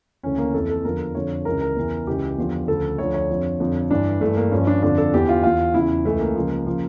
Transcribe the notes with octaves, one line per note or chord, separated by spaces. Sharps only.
D2 C#3 E3 C#4
A#3
F2 E3 A4
A4
E2 D3 F3 A#4
F2 D3 F3 C#5
C#2 C#3 E3 A#4
A#4
E2 C#3 E3
C#2 C#3 E3 G4
E2 D3 F3
D2 C#3 F3 A4
D2 D3 F3 C#5
C#5
F2 D3 F3
F2 D3 F3
G2 E3 D4
G2 E3 A3
A#3
G2 F3 C#4
D4
F2 D3 F3 D4
A4
E2 E3 G4
F4
E2 E3 F4
E2 C#3 E3 E4
C#2 C#3 E3 A3
A#3
C#2 C#3 F3
C#3 F3